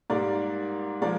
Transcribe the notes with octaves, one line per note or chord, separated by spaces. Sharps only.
G#2 G3 A#3 A#4 D5
F3 G#3 A#4 D5